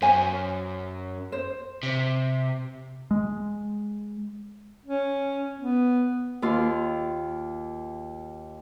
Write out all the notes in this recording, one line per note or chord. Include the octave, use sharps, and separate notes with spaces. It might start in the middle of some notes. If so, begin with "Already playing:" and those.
F#2 C5 G#5
C5
C3
G#3
C#4
B3
D#2 F4